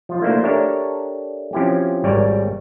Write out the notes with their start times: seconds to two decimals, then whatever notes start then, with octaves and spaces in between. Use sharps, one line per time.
0.09 F3 F4
0.22 A3 A#3 D4 E4 F#4 C5
0.44 D4 G4 A4 A#4 C#5 E5
1.53 F3 C4 C#4 E4 F#4 G4
2.04 G#1 G3 A#4 C#5 D5 G#5